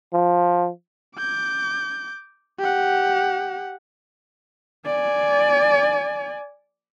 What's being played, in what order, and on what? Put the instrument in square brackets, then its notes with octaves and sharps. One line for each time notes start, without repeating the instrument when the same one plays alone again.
[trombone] F3
[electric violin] D6 G6
G4 F#5
[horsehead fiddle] D5 G#5